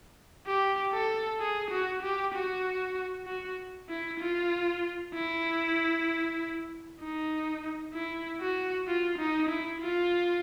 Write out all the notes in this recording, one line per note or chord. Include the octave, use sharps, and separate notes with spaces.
G4
A4
G#4
F#4
G4
F#4
F#4
E4
F4
E4
D#4
E4
F#4
F4
D#4
E4
F4